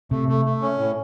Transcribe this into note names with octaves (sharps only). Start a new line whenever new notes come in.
C3 A3
A3
A3
C#4
A2